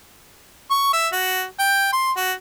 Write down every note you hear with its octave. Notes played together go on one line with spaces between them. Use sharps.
C#6
E5
F#4
G5
C6
F#4